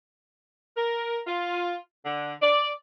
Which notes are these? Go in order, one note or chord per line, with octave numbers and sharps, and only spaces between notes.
A#4
F4
D3
D5